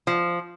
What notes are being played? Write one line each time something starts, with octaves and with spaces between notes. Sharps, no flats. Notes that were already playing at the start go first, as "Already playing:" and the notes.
F3